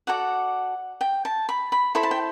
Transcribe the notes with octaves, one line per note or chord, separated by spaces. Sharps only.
F#4 A4 D5 F#5
G5
A5
B5
B5
E4 A4 C5 B5
A5
G5